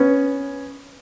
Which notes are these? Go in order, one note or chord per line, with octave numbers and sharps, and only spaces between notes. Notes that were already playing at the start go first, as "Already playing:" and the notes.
Already playing: B3 C#4